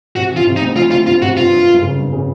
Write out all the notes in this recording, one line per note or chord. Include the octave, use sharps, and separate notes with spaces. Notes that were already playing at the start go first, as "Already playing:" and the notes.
C3 F#4
E3 F4
C3
D#4
D2
E3 F4
D2 F4
D2 F4
C3 F#4
G1 F4
G1
F#2
C#3
G1
C#3